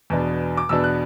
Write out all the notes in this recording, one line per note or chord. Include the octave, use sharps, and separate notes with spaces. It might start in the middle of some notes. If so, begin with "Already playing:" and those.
E2 B2 B3 D4
D6
E2 B2 B3 D4 E6
F#6